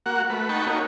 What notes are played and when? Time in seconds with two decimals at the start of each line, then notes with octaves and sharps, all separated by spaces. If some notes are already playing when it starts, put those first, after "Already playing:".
0.06 A#3 F#4 F#5
0.30 A3 B4
0.49 D#4 F#5 G5 A5 B5 C#6
0.66 A#3 D#4 F#4 C#5